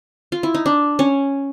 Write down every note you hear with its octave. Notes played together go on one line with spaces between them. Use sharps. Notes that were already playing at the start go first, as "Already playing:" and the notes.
F4
E4
D#4
D4
C#4